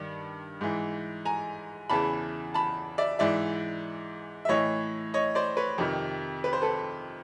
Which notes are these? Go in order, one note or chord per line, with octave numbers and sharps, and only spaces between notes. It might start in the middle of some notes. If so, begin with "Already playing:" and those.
Already playing: G2 D#3
G#2 E3
G#5 A#5
E2 C#3 E3 A5 B5
A5 B5
D5 E5
G#2 E3 D5 E5
E5
A2 E3 C#5 D#5
C#5 D#5
C5 D5
B4 C#5
F2 C3 D#3
B4
C5
A4 B4